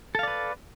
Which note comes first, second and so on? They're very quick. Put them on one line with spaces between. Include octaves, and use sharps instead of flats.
A4 F5 D5 B4